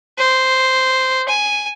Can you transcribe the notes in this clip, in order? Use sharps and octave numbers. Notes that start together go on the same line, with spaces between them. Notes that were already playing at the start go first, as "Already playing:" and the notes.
C5
G#5